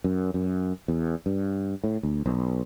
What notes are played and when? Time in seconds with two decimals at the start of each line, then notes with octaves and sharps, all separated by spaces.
0.04 F#2
0.34 F#2
0.88 E2
1.26 G2
1.84 A2
2.03 D2
2.26 B1